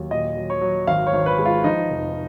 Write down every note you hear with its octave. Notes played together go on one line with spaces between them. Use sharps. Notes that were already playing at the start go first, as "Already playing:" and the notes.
Already playing: D#2 F#3
A#2 D#5
F#3
C#5
F#3
G#1 F5
C#5
G#1
B4
G#3
F4
F3 D#4
F1